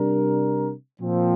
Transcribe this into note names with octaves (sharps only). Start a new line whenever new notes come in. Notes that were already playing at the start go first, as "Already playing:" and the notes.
Already playing: C3 G3 D4 A#4
A#2 F3 C4